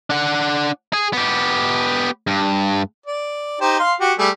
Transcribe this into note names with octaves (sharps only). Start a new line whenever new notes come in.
D4 F#5
G#4
B3 G4
G2
D5
D#4 G4 C5
F5 C6
F#4 G4
G3 A3 G#4